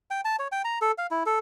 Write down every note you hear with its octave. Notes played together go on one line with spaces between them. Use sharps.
G5
A5
C#5
G5
A#5
A4
F5
E4
A4